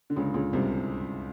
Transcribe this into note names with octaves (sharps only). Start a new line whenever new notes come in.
D3
C#2 C#3
C#2 C#3
C2 C3